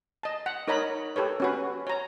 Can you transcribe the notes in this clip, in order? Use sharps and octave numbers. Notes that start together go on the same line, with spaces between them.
D#5 A5
F#5
D#4 A#4 C#5 D#5 A#5 B5
G4 A4 B4 C#5
C#4 F#4 B4
C#5 A#5